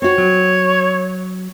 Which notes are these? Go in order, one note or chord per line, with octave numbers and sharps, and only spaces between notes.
C4 F#4 C#5
F#3